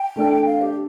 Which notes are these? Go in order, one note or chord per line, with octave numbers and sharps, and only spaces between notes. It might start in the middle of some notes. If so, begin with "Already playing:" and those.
Already playing: G5
A3 D4 A4
F5
G4